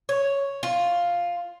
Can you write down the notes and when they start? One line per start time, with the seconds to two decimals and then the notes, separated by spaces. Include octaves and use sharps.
0.09 C#5
0.63 F4